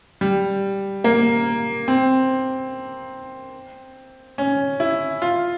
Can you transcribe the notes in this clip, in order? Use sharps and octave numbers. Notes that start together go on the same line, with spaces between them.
G3
A#3
C4
C#4
E4
F4